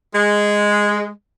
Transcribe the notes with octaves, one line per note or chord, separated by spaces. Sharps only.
G#3